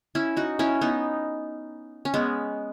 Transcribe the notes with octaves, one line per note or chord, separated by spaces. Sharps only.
C#4 E4
D#4 F#4
C#4 E4
B3 D#4
C#4
G#3 B3